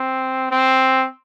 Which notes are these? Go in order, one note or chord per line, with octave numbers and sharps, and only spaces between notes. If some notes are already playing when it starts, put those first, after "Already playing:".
Already playing: C4
C4